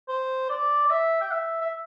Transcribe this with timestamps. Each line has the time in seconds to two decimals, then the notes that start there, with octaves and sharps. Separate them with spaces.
0.09 C5
0.50 D5
0.87 D5
0.90 E5
1.21 G5
1.31 E5
1.61 E5